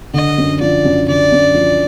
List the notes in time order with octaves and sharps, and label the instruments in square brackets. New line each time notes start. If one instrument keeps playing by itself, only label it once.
[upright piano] D3 [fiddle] D#5
[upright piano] F#2
[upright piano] F3 [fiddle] D5
[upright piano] F#2
[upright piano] D3 [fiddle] D5
[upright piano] F#2
F3